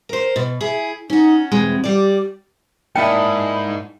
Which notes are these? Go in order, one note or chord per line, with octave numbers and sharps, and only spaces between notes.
A#4 C5
B2
E4 G#4
C#4 D#4 F#4
E2 B2 G#3 C4
G3 G4 D5
G#2 A#3 D4 E4 D#5 G5 B5